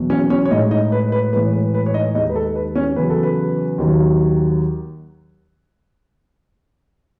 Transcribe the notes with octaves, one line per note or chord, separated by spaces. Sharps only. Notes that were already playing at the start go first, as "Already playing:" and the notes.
Already playing: E2 B2 F#3
C#4 C#5
C#4 C#5
C#5
A2 G#3 D#4 D#5
D#4 D#5
B4
B4
A2 E3 G#3 B4
C#5
B4
B4
C#5
D#4 D#5
D#2 D#3 G#3 D#4 D#5
B4
A4
B4
C#4 C#5
E2 C#3 F#3 B4
A4
B4
D#2 D#3 F#3